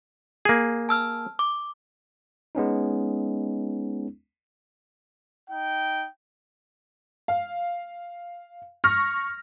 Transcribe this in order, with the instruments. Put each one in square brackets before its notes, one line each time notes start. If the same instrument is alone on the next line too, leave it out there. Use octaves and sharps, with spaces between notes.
[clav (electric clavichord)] A#3 G#4
[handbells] A5 E6 F6
D6
[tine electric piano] G#3 B3 C#4 D#4
[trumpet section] D#4 G5
[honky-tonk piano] F5
C#6 F6 A#6